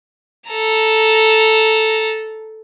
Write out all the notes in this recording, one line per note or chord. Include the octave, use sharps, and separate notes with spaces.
A4 A#5